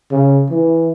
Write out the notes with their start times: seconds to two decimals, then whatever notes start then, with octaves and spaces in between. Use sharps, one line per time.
0.11 C#3
0.51 E3